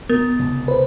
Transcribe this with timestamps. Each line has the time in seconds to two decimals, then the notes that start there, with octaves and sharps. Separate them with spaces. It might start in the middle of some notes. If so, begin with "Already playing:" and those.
0.09 B3 A#4
0.39 F1 C#2
0.68 B4 C5